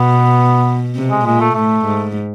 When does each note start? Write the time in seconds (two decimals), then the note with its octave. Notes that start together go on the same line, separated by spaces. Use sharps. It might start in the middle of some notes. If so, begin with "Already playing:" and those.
Already playing: B2 B3
0.95 C3
1.10 G#3
1.26 A#2 G#3
1.41 A3
1.55 A2 A3
1.85 G#2